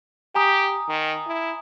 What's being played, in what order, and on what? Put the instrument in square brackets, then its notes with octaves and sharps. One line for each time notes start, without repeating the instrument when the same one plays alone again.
[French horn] G4 [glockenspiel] G#5 A#5 D#6
[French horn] D#3
E4